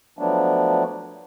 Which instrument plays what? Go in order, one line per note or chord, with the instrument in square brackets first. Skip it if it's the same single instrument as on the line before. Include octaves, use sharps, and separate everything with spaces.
[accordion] F3 F#3 A3 B3 D4